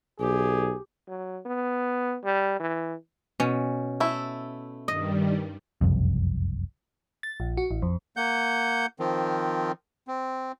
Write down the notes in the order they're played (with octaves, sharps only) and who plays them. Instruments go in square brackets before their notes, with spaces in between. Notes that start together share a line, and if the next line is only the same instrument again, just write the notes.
[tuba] B1 [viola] G4 [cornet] G#4
[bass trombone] F#3
B3
G3
E3
[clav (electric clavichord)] B2 [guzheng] C#4
[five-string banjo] A3 E4
[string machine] G2 D#3 G3 [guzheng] D#5
[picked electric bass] F#1 C2 F2
[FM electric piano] A6
A#1
F#4
A1
F2
[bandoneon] A#3 F#5 G6
D#3 F3 C4
C4